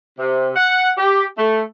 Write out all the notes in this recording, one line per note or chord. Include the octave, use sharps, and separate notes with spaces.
C3
F#5
G4
A3